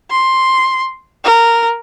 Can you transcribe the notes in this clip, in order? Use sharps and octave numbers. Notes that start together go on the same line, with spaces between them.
C6
A#4